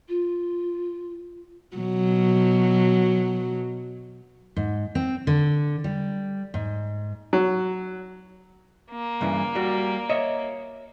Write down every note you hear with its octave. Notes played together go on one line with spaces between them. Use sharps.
F4
B2 F#3
G#2
C4
D3
G3
G#2
F#3
A#3
G2 C#3 E3
G3 F#4
C#5 D#5 E5